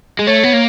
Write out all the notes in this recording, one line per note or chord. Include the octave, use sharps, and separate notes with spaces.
G#3
A3 C#5
B3
A#3